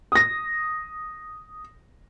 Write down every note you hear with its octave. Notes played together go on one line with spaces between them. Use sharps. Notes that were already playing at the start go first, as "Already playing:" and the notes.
D#6 A#6